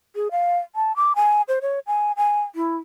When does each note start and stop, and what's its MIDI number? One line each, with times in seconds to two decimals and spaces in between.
0.15 0.28 68
0.31 0.58 77
0.75 0.95 81
0.96 1.13 86
1.16 1.42 80
1.48 1.59 72
1.62 1.79 73
1.87 2.12 80
2.17 2.42 80
2.55 2.77 64